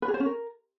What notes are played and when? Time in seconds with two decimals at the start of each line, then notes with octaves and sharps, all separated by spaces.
0.02 B4
0.08 G#4
0.14 C5
0.20 C#4
0.26 A#4